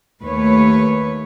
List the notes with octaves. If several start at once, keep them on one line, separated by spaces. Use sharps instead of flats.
D#2 A3 B4 C#5